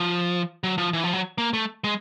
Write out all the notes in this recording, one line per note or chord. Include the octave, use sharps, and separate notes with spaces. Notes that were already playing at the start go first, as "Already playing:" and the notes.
Already playing: F3
F#3
F3
E3
F3
F#3
A#3
A3
G#3